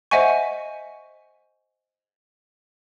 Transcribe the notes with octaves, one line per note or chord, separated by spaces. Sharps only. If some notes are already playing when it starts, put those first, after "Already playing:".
C5 D#5 E5 F#5 G#5 C#6